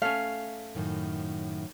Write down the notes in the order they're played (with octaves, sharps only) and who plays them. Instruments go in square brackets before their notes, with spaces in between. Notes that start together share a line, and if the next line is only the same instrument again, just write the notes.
[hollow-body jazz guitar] A3 C#4 [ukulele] F5
[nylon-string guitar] F#2 A2 D#3